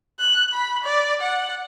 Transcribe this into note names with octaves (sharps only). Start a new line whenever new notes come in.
F#6
B5
D5
F#5